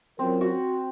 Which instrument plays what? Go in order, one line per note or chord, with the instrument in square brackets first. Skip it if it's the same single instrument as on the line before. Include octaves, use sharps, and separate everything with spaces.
[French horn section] F#3 C#4 F4 A#4 [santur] C4
[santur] F#4